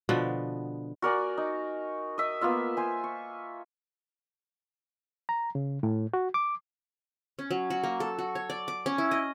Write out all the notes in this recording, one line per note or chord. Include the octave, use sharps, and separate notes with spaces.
B2 D3 F3 B3
F#4 A#4 D5 G#5
D#4
D#5 E5 D#6
A#3 B3 F4 E5
C5 G#5
C#6
A#5
C#3
A2
F#4
D6
C#4
F#3
F#4
A#3
A4
F#4
C#5
D5
D6
C#4
E4
D#5